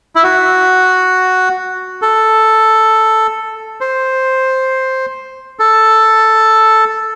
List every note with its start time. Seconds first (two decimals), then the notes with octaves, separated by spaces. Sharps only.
0.15 E4
0.23 F#4
2.02 A4
3.81 C5
5.59 A4